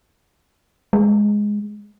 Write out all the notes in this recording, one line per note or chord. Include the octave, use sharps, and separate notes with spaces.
G#3